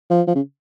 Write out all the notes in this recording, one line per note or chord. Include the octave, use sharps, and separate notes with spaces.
F3
F3
C#3